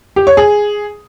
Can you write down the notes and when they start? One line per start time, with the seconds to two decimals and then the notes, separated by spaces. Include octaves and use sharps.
0.16 G4
0.27 C#5
0.37 G#4